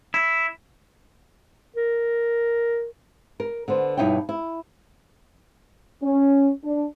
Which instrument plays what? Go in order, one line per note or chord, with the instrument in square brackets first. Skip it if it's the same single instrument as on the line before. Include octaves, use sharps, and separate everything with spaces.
[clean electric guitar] E4
[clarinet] A#4
[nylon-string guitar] A#4
D3 B3 C5
G2 B2 D#4 E4 C#5 G5
E4
[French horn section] C#4
D4